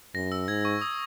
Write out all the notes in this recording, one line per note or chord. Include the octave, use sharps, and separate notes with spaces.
F#2 A#6
E6
G#2 G#6
C#6
D#6